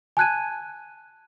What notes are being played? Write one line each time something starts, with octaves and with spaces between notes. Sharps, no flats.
G#5 A5 F#6 G#6 D#7